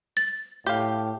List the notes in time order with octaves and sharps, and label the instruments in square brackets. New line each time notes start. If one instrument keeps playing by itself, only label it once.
[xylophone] A6
[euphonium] A2 [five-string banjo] G4 F5